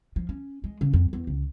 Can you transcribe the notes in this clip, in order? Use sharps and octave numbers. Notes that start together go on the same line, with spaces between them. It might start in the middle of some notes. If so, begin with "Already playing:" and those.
F3
C#4
G#3
C#3
F2
E2
C#2